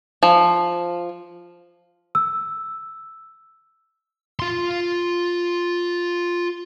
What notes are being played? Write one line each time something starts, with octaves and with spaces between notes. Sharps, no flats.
F3
E6
F4 C6